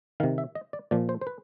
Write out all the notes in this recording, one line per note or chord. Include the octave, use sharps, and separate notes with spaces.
C3 D#3 F5
E5
D#5
D5
A#2 F3 D5
C5
C5
B4